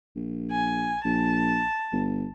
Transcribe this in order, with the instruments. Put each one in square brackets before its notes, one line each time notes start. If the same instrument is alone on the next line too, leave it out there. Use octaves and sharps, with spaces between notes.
[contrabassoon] A#1
[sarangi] G#5
[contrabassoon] A#1 [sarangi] A5
[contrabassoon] G1